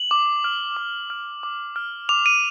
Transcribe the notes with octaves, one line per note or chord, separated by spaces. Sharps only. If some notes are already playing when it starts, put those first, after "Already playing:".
Already playing: F#7
D6
F6
D6
F6
D6
F6
D6 F7
D#7